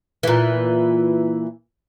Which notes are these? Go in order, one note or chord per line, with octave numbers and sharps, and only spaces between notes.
A#2 E3